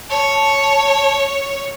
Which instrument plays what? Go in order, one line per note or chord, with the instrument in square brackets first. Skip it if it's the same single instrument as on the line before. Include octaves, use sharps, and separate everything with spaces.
[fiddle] C#5 [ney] A5